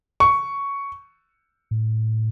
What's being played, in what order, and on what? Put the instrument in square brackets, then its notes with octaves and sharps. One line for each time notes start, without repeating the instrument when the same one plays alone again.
[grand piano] C#6
[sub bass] A2